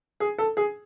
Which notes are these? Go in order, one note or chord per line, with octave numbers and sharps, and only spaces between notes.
G#4
A4
G#4